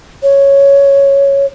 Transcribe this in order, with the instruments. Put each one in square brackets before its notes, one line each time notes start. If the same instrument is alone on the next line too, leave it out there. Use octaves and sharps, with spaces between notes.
[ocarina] C#5